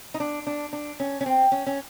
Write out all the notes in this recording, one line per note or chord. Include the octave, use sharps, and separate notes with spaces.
D#4
D4
D4
D4
C#4
C#4
C4
C#4
C#4